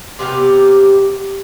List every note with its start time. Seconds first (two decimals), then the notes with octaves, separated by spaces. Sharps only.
0.19 C3 B3 G4 A#4